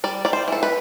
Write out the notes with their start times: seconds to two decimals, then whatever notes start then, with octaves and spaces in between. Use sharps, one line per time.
0.04 G3 D5
0.25 G3 D5
0.33 C5
0.48 E3 A4
0.63 B4